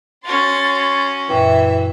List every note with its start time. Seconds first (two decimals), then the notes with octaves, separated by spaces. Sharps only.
0.25 C#4 F#4 C6 A6
1.29 F#2 A#2 E3 E5 G5